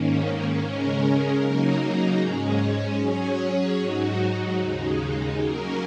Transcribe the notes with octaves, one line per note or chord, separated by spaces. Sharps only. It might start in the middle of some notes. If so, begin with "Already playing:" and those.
Already playing: G#2 D#3 A#3 C#4
C#3 G#3 C#4 A#4
C#3 F#3 A#3 D#4 A#4
G#2 G#3 C#4 G#4
F#3 C#4 G#4 C#5
G#2 F#3 D#4 F#4
D#2 C#3 G#3 D#4
F#3 A#3 C#4 A#4